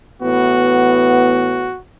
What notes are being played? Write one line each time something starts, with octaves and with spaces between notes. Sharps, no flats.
A2 E3 B3 F#4